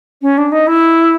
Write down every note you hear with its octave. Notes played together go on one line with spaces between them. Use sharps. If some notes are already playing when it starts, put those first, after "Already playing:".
C#4
D4
D#4
E4